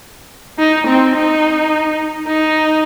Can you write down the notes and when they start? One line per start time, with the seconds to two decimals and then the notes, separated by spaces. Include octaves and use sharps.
0.58 D#4
0.87 C4
1.15 D#4
2.27 D#4